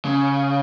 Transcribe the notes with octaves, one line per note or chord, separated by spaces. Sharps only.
C#3